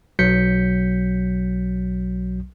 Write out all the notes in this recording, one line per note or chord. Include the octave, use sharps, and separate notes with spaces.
B1 F#3 G6 B6 C#7